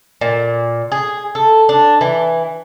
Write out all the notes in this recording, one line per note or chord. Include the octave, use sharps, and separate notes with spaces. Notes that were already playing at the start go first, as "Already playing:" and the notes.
A#2
G#4
A4
D4
E3